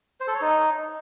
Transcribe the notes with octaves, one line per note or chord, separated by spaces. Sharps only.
C5
A4
C#5
D#4